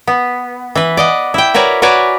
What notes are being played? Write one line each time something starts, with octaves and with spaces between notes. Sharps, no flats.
B3
E3 B4
D5 D#5 F#5
E4 G5
F#4 A#4 B4 C#5 D5
F#4 A#4 B4 C#5 D5 G#5